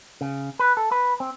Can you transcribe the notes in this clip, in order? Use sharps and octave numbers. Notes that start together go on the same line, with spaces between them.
C#3
B4
A4
B4
C4